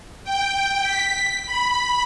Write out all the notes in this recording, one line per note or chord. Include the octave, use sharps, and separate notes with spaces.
G5
B6
B5